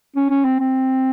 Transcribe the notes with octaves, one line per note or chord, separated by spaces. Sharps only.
C#4
C#4
C4
C4